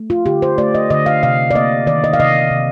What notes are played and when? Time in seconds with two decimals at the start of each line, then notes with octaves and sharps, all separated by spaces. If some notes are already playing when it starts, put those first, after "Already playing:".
Already playing: A3
0.10 F4
0.26 D3 G4
0.42 C5
0.58 A3 D5
0.75 D#5
0.90 D3 D#5
1.06 F5
1.23 C3 F5
1.51 D5
1.55 A#3 D#5
1.87 D#3 D5
2.04 D#5
2.13 F5
2.20 C3 D#5
2.51 C3